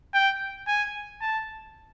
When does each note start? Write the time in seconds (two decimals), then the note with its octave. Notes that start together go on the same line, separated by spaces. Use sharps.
0.14 G5
0.68 G#5
1.22 A5